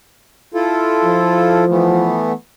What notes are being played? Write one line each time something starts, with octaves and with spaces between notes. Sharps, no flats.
E4 F4 A4
F3
E3 A3 B3